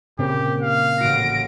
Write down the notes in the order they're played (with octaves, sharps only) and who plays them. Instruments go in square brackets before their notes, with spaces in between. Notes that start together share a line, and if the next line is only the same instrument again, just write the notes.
[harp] A#2 [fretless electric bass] C#3 C4 [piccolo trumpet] G4
[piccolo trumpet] F5
[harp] A1 F#4 [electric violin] A#6 D7